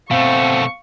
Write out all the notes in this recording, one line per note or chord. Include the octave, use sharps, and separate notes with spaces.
B2 A3 C4 F5 C#6